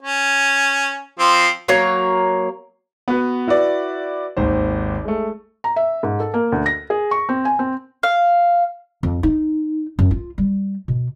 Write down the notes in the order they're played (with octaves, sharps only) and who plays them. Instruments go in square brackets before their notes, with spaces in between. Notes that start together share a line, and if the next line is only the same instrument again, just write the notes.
[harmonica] C#4
F3 C4
[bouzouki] F#3 A#3 A#4 C#5
[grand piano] B3 F#4 B4
E4 F#4 B4 D5
G#1 D#2 C5
G#3 A3
[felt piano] A#5
E5
G#2
A4
A#3
D2
A#6
G#4
C#6
C4
G#5
C4
[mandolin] F5
[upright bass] F2
D#4
F#2
F4
G3
B2